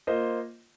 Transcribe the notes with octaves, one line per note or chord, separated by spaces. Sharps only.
A#3 F4 C5 D#5